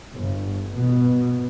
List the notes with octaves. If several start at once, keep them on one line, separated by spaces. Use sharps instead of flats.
G1
B2